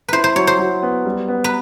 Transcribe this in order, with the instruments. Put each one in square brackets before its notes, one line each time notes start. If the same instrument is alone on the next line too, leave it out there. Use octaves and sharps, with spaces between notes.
[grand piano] E4 [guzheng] B4 C5
[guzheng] C5
[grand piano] F#3 [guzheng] C#5
[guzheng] C5
[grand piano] F#3
B3
G3
B3
[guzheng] B4